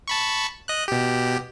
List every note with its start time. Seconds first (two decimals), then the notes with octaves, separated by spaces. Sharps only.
0.08 A5 B5 C#6
0.68 D#5 F#6
0.88 B2 G4